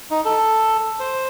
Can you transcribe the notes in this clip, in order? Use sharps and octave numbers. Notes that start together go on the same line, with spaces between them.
D#4
A4
C5